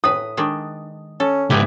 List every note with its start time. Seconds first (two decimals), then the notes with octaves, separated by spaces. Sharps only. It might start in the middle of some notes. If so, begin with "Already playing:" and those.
0.04 A2 B4 D#6
0.37 D#3 G#3 D4
1.20 C#4 A4
1.50 C#2 G#2 B3 E4 G4